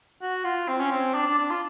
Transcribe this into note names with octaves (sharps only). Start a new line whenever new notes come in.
F#4
F4
C4
C#4
C4
D4
D4
D4
F4